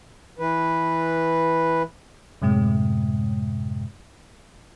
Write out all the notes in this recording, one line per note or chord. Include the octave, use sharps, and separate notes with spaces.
E3 B4
F#2 A2 C3 G#3